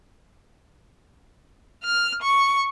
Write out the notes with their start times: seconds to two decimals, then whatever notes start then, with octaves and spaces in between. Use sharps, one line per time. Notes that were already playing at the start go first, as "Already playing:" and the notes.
1.84 F6
2.22 C#6